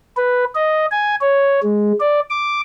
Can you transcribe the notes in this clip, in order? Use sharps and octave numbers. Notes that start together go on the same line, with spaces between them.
B4
D#5
G#5
C#5
G#3
D5
D6